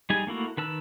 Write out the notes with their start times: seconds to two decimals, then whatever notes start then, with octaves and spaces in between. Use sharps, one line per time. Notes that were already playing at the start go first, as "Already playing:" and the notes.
0.10 G3 D#4 G#4 G#5
0.27 A3 A#3 E4 F#4
0.57 D#3 B4 A5 E6